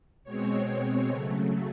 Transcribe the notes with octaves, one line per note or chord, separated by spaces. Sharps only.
B2 G#3 C4 C#5
C#3 F#3 A3